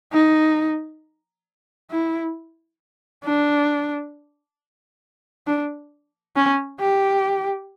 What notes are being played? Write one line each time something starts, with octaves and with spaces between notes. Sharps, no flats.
D#4
E4
D4
D4
C#4
G4